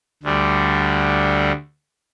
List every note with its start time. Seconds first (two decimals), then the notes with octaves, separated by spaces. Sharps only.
0.23 D2 D3 G3